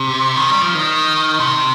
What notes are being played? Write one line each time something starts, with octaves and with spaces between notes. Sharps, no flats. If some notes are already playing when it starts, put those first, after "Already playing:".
Already playing: C3
D#3
G3
F3
D#3
C3